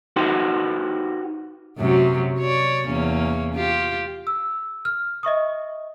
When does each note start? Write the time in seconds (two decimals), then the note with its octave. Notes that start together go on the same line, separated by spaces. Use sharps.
0.16 D#4 F#4 G4 B4 C5
1.78 F#2 C3 F#3
2.40 C#5 D5
2.86 E2 A#3 C#4
3.54 F4 G4
4.27 E6
4.85 F6
5.23 D#5 E5 C#6 D#6